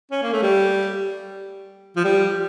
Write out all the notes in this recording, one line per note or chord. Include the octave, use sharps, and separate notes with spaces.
C#4
A#3
A3
G3
F3
G3